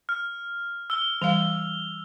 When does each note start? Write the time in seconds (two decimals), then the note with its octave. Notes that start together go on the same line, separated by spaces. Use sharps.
0.09 F6
0.90 E6 G7
1.22 E3 G3 F5 F7